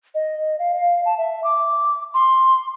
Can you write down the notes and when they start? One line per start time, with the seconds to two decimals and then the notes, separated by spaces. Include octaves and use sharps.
0.15 D#5
0.59 F5
0.75 F5
1.05 A5
1.18 E5
1.44 D6
2.14 C6